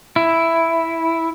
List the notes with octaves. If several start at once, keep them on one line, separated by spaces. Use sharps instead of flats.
E4